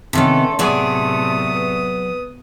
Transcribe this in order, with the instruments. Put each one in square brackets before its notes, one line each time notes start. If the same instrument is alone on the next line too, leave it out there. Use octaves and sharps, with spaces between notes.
[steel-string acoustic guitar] C3 D#3 B3 [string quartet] A3 C#4 A4 [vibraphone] A5 C6
[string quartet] A2 C3 A3 [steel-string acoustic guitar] F#3 G#4 D5 [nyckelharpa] B3 D#6
[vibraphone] B4